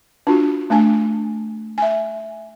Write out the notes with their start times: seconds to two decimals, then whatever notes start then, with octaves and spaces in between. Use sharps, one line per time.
0.27 D4 F4 F#4
0.70 A3 D4 G#5
1.78 E5 G#5